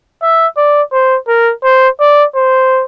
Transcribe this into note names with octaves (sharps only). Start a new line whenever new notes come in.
E5
D5
C5
A#4
C5
D5
C5